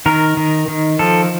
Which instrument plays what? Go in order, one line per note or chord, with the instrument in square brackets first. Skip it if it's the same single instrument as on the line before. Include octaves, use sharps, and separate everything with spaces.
[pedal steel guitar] D#3 A#4
D#3
D#3
F3 A4